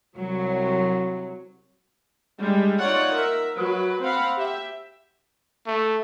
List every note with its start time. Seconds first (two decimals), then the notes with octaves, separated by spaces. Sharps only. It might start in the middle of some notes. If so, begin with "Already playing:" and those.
0.15 C2 F#3
2.40 G3 G#3 D4
2.79 D#4 F4 C#5 D5 F#5
3.14 A#4 E5
3.55 F#3 B4
4.02 C4 F5 F#5 B5
4.36 G4 E5
5.67 A3